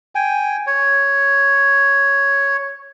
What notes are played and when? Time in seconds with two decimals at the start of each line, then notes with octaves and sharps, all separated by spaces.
0.15 G5 G#5
0.67 C#5